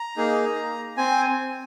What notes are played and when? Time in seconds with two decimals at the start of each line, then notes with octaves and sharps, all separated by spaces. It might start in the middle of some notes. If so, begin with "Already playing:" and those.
Already playing: A#5
0.17 A#3 D#4 G#4
0.97 C4 G#5